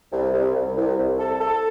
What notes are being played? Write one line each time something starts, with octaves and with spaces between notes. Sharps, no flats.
C2
C2
C2
C2
C2
A4
A4